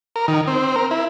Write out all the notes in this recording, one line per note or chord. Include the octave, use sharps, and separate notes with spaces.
A#4
D#3
C4
A#4
E4